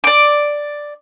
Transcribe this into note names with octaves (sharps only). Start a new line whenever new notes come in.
D5 D6